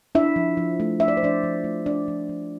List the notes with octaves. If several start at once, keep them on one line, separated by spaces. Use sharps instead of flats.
D4 E4 E5
F3
F3
A3
D4 E5
D5
C5
F3 D4 D5
F3
A3
D4 D5
F3
F3